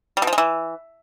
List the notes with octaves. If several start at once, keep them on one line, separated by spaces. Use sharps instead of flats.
G3
B2
F3
G#3
E3